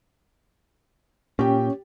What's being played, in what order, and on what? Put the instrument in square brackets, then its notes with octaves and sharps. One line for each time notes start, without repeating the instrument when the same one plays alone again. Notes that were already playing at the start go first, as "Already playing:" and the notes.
[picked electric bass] A#2 [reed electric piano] C#4 C#5 [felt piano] G4 G5